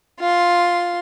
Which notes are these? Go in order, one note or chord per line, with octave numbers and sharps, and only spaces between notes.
F4 C6